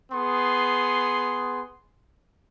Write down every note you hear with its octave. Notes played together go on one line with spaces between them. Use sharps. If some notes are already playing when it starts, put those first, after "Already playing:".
B3 G#4 C6